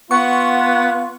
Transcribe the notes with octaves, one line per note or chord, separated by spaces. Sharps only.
B3 F4 F#5 C#6